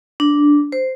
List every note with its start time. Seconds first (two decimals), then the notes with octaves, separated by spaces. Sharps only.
0.20 D4
0.72 C5